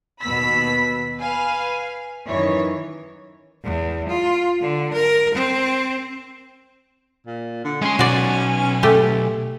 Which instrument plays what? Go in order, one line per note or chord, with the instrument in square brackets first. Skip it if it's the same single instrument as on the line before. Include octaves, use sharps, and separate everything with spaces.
[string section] D#2 B2 B3 B5 E6 B6
B4 F5 G#5
F#2 D#3 E3 C#5
[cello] E2
F4
D3
A#4
C4
[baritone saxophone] A#2
D3
[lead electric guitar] G#3 C6 [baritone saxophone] C#4
[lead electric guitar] B1 [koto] F#4 D5
[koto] A3 G4